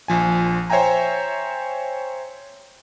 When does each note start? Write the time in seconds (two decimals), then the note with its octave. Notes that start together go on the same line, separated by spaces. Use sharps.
0.08 A#1 F3 G#5
0.70 C5 C#5 E5 G5 G#5 A#5